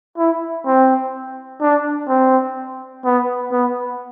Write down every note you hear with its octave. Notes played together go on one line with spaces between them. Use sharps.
E4
C4
D4
C4
B3
B3